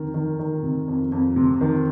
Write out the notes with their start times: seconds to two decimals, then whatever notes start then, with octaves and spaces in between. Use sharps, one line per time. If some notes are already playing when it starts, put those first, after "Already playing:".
Already playing: F2 D#3 A#4
0.14 D#3
0.39 D#3
0.63 C3
0.88 F2
1.12 F2
1.36 C3
1.61 D#3